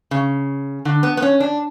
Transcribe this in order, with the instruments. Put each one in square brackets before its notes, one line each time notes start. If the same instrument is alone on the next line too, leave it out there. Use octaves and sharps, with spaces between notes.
[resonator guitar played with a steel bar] C#3
D3
B3
B3
C#4
D4